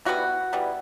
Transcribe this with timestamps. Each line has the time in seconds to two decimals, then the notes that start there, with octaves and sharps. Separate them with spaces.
0.05 E3 G3 B3 F#4
0.53 E3 G3 B3